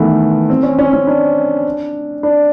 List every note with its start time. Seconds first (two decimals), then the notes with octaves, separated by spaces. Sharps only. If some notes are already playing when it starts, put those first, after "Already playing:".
Already playing: D#3 E3 A3 B3
0.50 C4
0.63 C#4
0.79 C#4
0.93 C#4
1.07 D4
2.23 D4